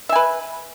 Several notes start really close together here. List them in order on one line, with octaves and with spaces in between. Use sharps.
E5 G#5 B4